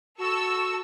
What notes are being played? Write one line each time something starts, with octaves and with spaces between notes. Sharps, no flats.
F#4 A4 C#6 E6